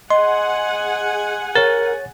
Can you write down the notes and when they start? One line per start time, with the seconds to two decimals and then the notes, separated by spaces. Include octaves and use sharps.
0.10 G#4 D#5 F#5 G#5 C6
1.55 A#4 C#5 A6